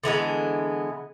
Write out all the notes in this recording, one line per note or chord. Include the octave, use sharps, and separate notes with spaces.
D3 E3 G#3 B3